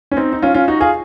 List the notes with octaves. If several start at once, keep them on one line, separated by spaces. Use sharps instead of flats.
C#4
C4 D#4
D#4
C#4 F4
C#4 F4
D#4 F#4
F4 G#4